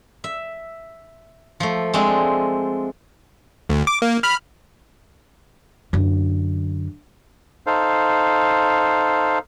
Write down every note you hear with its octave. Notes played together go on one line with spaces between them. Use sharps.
E5
F3 A3
G#3 A3 C4 D4
D2
D6
A#3
B5 F6
F#2 D3
D#4 A4 C5 F5